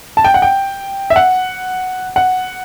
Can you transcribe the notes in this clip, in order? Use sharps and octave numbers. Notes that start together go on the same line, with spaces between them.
A5
G5
F#5
G5
E5
F#5
F#5